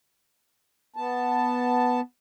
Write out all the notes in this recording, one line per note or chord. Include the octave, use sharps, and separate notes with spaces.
B3 A5